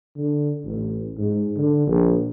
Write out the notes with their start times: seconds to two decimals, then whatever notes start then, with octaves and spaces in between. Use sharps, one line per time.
0.16 D3
0.65 A1
1.18 G#2
1.57 D3
1.87 A#1